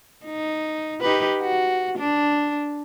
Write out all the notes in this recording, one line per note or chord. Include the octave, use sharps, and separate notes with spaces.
D#4
D#4 G4 B4
F#4
D4